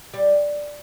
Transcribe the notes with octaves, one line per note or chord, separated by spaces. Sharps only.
G3